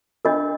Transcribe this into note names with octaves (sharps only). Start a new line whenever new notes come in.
D4 F4 A#4 D#5